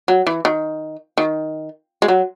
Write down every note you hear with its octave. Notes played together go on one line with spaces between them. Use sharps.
F#3
E3
D#3
D#3
G#3
F#3